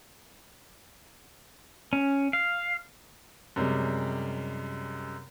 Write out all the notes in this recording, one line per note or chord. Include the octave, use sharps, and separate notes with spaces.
C#4
F5
F#2 C3 G3 G#3